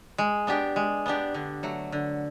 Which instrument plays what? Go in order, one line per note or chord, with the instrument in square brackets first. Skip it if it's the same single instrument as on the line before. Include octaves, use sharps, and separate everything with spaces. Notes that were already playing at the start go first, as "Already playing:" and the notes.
[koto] G#3
B3 D4 G4
G#3
B3 D4 G4
D3
F#3 A3
D3